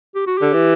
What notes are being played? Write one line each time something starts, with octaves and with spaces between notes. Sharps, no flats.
G4
F#4
D3 G4
E3